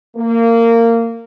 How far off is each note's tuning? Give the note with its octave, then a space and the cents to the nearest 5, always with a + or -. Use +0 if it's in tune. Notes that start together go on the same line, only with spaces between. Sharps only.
A#3 -20